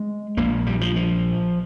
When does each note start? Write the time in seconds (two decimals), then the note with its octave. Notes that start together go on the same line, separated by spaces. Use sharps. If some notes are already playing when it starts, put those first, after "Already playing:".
Already playing: G#3
0.37 A#1 A#2 A#3
0.67 G3
0.81 F3
0.96 F3